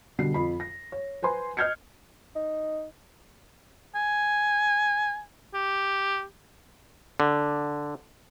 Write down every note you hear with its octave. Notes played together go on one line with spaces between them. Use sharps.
B2 D3 G3 C7
F2 B5
A#6
C#5
B4 C5 G#5 C6
D#5 F6 G6 G#6 C7 C#7
D#4
G#5
G4
D3